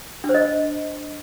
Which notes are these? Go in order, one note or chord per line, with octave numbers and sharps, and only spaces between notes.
D4
C5
D#5